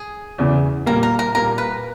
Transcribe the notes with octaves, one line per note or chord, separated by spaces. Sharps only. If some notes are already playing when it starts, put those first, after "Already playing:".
Already playing: G#4
E2 C#3 E3
A#2 G3 A#3 A#4
A#4
A#4
A#2 G3 A#3 A#4
B4